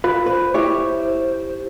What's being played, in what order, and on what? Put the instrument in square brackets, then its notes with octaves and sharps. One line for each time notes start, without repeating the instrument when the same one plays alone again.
[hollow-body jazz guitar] F4 B4
[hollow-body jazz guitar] B4 [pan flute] C5
[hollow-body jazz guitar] E4 G4 C#5